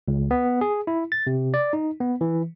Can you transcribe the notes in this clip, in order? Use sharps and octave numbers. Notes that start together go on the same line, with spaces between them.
C#2
B3
G#4
E4
A6
C3
D5
D#4
B3
E3